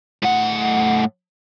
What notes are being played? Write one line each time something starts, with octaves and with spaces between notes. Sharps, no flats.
A2 F#5